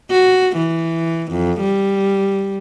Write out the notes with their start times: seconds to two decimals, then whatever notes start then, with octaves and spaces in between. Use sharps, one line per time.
0.11 F#4
0.57 E3
1.32 F2
1.61 G3